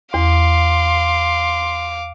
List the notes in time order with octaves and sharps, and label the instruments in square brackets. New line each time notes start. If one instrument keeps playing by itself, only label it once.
[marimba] E2 [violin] F5 D6 [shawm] C6